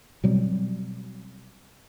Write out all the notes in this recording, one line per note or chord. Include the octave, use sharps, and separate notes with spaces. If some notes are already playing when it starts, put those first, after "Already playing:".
B2 F#3 G3 C4